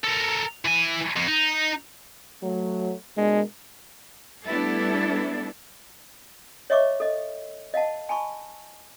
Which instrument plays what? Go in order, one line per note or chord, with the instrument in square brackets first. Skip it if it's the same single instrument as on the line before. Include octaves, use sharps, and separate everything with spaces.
[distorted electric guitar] A4 A#4
E3 G#5
F2
D#4
[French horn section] F#3 A3
[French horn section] B2 D4 A#4 [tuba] G#3
[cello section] G3 A3 B3 D4 E4 A4
[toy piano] C#5 D#5 E5 C#6 D6
A4 D#5
D#5 F5 F#5 A5
G#5 A5 B5 C#6